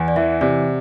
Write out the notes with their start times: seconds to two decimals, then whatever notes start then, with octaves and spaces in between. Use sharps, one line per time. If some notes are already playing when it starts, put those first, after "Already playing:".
Already playing: E2 F#5
0.08 D5
0.16 E3 E5
0.41 C3 D5